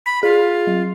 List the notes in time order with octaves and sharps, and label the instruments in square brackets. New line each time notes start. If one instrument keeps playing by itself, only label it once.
[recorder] B5 [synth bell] B6
[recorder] F4 [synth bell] G#4
[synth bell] F#3